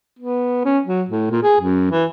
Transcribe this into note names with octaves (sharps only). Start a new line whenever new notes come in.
B3
C#4
F#3
A2
A#2
G#4
F#2
E3